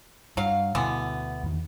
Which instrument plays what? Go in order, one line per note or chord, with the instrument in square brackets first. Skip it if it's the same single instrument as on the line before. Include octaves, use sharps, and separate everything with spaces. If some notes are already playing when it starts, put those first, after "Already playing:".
[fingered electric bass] G2 [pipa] F#3 F5
[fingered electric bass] D2 B2 [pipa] D3 E3 B3
[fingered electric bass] E2 D#3